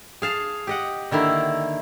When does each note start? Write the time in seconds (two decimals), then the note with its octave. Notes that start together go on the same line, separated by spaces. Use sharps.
0.22 G#4 F5 A5
0.67 G4 D#5 F#5
1.11 D3 D#3 A#3 E4